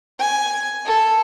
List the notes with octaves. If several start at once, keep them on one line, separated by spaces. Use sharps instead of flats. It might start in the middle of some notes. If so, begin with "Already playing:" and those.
G#5
A4